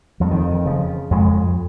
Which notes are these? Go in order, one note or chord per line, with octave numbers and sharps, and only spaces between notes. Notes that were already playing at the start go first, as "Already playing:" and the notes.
F2 F3
D#3
D#3
C#3 F3
F2 G#3